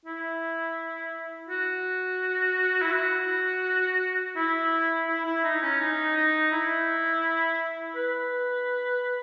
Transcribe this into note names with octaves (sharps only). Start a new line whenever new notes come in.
E4
F#4
E4
F#4
E4
E4
E4
D#4
C#4
D#4
D#4
E4
B4